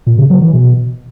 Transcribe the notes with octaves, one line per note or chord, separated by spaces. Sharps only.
A#2
C#3
F#3
E3
B2